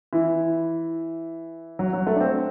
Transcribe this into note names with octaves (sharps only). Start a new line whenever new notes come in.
E3
F#3
F#3
A3
D4
C4